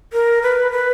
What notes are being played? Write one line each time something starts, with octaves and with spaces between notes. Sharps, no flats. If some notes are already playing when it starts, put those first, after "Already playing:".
A#4
B4
B4